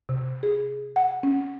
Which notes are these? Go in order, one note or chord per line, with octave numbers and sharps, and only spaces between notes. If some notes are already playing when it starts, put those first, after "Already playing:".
C3
G#4
F#5
C#4